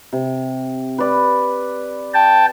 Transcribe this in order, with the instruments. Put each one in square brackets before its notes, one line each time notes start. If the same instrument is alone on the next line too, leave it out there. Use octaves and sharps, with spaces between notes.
[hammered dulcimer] C3
B4 D5
[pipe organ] G5 A5